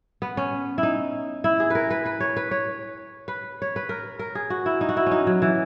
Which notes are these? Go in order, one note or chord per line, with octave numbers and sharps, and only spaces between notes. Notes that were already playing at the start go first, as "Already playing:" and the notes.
B3
C#4
E4
D#4
E4
G#4
A#4 B4
B4
B4
C#5
B4
C#5
B4
C#5
B4
A#4
A#4
G#4
F#4
E4
D#4
F#4
E4
C#4 D#4
F#3
E3